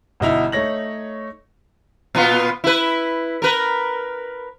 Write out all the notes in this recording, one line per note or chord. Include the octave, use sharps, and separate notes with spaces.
G1 B2 D#4 E4 F7
A3 D#4 C#5 A#6 F#7
A#2 B3 F4
E4 B4
A#4 B4